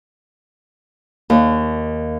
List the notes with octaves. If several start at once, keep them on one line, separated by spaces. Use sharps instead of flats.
D#2